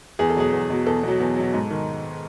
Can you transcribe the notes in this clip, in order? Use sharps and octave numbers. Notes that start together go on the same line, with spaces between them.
E2 G#4
A4
B2 F#3 G#4
E2
B2 F#3
E2 A4
B2 F#3
E2
B2 F#3
G#2
D#3